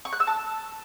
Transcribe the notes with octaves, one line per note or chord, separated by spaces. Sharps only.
C#6
F#6
E6
A5